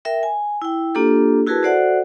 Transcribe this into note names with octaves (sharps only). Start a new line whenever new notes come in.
A#4 E5 G5
G#5
E4 G5
A#3 D4 F4 G4 A4
E4 F#4 G#4 A#4 B4 A5
F#4 A4 C5 D5 E5 F#5